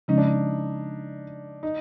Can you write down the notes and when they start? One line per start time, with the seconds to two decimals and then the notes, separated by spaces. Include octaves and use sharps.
0.08 C#3 F3 G#3 C#4 D#4
0.18 D4
0.26 D#4
1.63 D#4